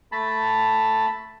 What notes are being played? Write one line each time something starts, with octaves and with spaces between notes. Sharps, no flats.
A3 A5 B5